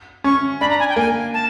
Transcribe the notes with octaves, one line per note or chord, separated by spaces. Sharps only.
C#4 C#6
D4 B5
A#5
G#5
G5
A#3 G#5
A5